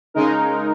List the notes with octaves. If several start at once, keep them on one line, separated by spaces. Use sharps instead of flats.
C#3 G#3 D#4 A#4